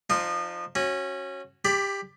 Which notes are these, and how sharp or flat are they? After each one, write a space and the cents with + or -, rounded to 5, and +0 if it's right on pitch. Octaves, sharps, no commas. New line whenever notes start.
F3 +0 D#4 -35 C6 +0
C#4 -20 F#4 +0
G4 +15 D5 +0 B5 +20